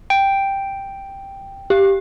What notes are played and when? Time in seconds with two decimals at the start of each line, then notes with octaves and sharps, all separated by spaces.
0.10 G5
1.70 G4